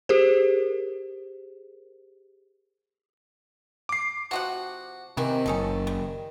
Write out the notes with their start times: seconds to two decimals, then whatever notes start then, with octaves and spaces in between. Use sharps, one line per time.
0.09 G4 G#4 A#4 C5
3.89 D6 C7
4.31 C3 F3 F#4 F#5
5.17 C3 D#3 E3 G3
5.46 F#1 C#4 D#4 A4
5.87 G3